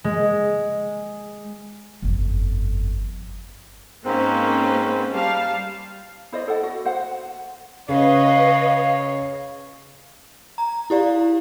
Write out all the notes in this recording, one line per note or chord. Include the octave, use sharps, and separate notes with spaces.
G#3
G1 F2
G#2 A#3 C4 C#4 B4
G3 F5 A5
E4 C5 D5 D#5
A4 D5 F#5
F#4
C5 F#5
C#3 B4 C#5 D#5 F5
A#5
E4 G4 D5 F5